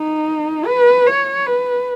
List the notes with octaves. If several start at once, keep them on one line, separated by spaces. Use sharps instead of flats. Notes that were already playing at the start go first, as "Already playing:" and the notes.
Already playing: D#4
B4
C#5
B4